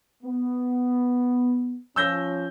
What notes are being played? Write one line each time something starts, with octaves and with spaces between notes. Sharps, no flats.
B3
F3 C#4 E6 G6 A#6